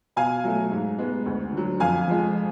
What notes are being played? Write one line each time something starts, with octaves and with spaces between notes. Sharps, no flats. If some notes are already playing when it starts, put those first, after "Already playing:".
B2 F5 G#5
F#3 A3
G#2
G#3 B3
D2
D3 F#3
F2 F5 G#5
F3 G#3